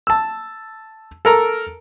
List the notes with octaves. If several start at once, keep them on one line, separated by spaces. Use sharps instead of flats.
A5 E6
A4 A#4 A#5